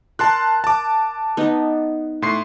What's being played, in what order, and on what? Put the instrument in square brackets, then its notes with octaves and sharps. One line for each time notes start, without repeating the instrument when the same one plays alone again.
[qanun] A#4 [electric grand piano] A5 C6 F#6
[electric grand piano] A5 D6
[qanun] B3 D#4
[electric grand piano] A2 C6 C7